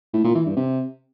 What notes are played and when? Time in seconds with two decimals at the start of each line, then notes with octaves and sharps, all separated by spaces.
0.13 A2
0.24 A#2
0.35 E3
0.46 G2
0.57 C3